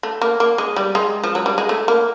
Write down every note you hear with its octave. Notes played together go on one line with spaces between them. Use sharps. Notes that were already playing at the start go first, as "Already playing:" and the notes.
A3
A#3
A#3
G#3
G3
G#3
F3
F#3
G3
G#3
A3
A#3